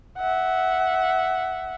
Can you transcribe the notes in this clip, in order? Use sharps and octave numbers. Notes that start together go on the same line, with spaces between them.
E5 F#5